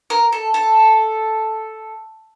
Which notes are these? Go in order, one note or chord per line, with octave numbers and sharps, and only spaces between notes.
A#4
A4
A4